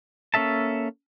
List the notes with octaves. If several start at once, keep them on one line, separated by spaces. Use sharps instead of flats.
A#3 C#4 A4 E5 A5